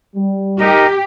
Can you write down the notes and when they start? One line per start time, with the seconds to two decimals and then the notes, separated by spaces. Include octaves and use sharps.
0.16 G3
0.60 D#4 G4 A#4 D#5